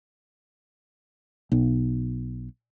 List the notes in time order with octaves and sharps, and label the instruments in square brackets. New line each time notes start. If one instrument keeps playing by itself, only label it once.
[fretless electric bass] B1